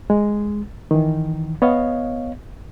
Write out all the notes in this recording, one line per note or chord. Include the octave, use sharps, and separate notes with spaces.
G#3
D#3 E3
B3 C#5 D#5 F5